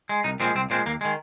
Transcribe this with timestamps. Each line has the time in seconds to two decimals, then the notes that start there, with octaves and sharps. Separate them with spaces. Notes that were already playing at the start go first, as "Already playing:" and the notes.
0.09 G#3
0.24 C2 D#4
0.40 A#2 F3 G#3 C4
0.55 C2 C4
0.70 A#2 F3 G#3 C4
0.86 D#2 A#3
1.01 D#3 G#3